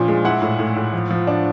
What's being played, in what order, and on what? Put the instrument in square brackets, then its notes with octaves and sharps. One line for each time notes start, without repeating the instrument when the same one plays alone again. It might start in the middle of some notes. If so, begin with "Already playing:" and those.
Already playing: [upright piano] A#2 F3 C#4 D4
G#3
E4 F#5
A2
A2
A2
F3
F3
D4